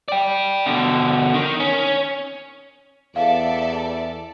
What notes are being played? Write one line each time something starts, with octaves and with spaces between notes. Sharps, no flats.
D5 G5
B2 D3
D#3
C#4
E2 A4 D5 E5 F5